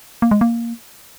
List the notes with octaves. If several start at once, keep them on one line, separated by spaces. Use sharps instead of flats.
A#3
G#3
A#3